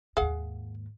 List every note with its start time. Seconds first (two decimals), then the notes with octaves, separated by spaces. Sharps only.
0.17 D#2 G#2 G#4 F5 F#5